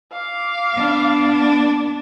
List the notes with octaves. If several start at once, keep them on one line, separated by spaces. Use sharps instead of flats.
F5 D6
B3 D4